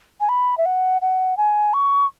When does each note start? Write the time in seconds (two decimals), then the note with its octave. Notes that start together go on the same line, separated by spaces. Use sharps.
0.20 G#5
0.29 B5
0.57 E5
0.65 F#5
1.02 F#5
1.37 G#5
1.73 C#6